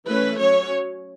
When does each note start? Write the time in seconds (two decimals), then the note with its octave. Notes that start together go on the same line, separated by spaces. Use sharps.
0.09 E3 A3 C#4 B4
0.40 F#3 C#4 C#5